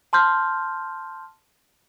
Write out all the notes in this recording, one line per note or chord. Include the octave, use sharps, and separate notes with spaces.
A5 C6 F6 G6